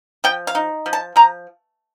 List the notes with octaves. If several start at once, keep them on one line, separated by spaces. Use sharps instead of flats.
F3 G5
F5
D#4
F3
A5
F3 A#5